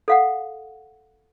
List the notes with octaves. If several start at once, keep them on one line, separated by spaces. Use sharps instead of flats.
A4 F5 F#5